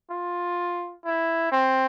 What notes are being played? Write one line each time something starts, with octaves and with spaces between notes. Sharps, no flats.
F4
E4
C4